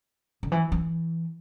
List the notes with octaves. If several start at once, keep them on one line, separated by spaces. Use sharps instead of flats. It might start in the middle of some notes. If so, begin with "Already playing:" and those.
D3
E3
E3